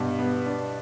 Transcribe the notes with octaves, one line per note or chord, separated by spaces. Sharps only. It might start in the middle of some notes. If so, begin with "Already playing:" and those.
Already playing: G2 B2
B3
D4